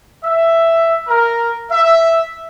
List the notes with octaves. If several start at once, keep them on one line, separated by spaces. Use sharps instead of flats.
E5
A#4
E5